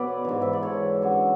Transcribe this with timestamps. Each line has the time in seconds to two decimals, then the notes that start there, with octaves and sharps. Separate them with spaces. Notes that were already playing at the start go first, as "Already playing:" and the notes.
Already playing: B2 F#3 A4 B4 D5
0.25 G#2 E3
0.42 E5
0.53 D5
0.63 A4 C#5
1.02 F#2 D3 F#3